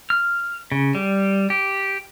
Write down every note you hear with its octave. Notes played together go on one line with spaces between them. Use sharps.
F6
C#3
G3
G4